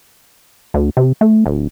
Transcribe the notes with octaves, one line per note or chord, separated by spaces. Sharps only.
D2
C3
A3
D1